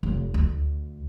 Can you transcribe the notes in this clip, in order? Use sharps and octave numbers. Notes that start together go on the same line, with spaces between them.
F1
D2